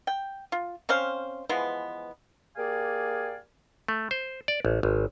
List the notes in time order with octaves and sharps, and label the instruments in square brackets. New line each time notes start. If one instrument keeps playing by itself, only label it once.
[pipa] G5
F4
C4 C#4 C5 F5
E3 F3 G#3 B3
[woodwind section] A#3 G4 G#4 D5 F5 G#5
[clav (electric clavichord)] A3
C5
D5
A1
G#1